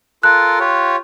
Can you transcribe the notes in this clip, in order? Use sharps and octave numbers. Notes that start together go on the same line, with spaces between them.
F4 A4 A#4 F#6
F4 G4 C#5